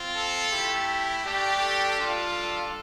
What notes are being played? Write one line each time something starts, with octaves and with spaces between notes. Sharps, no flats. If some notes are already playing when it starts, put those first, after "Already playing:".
Already playing: C4 F4
A4
A3 E4 G4
A3 D4 G4
A4
G3 D4 F4
A4